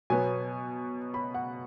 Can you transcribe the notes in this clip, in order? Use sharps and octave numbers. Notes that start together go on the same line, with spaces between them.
B2 F#3 B3 G#5
B5
F#5